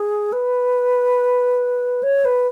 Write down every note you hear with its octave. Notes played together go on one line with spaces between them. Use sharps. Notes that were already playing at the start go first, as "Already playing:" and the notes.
Already playing: G#4
B4
C#5
B4